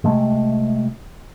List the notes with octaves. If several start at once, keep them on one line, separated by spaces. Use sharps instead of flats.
C3 G#3 A3